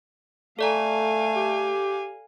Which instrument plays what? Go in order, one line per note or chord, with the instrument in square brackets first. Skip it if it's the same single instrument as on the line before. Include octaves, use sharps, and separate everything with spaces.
[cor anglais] A3 [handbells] A4 D5 A#5 [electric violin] F5 G#5
[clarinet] G4